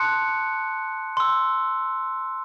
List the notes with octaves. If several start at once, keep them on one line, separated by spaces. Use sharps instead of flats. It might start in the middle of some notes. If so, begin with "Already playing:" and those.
Already playing: A5 C6 D#6 F#6 C#7
C6 E6